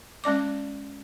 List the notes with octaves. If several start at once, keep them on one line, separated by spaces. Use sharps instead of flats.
G#3 C#4 D5 D6